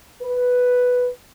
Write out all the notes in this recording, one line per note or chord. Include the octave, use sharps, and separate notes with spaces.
B4